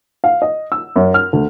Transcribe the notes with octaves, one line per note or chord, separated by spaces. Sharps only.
F5
D#5
E6
F#2
F6
D2